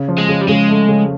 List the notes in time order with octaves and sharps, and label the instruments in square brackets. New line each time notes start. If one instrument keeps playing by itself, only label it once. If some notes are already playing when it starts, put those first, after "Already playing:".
Already playing: [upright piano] C#3
F3
[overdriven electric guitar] G#3
[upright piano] C#3
[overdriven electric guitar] G3
[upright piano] C#3 [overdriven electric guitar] G#3
[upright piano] A3
C#3